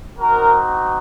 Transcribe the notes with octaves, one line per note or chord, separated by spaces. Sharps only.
C4 D#4 F#4 A#4